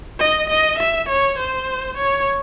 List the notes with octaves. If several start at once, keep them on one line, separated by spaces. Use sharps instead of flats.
D#5
D#5
E5
C#5
C5
C#5